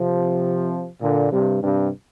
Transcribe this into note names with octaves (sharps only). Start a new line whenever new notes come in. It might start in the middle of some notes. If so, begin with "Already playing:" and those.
Already playing: C3 F3
A#2 D3
G2 C3
G2 C3